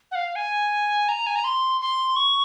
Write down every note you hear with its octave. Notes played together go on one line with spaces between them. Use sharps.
F#5
F5
G#5
A#5
G#5
A#5
C6
C6
C#6